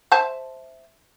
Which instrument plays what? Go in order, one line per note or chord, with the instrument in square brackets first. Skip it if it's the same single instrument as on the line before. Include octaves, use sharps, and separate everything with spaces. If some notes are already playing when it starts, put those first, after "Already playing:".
[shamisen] C5 E5 A5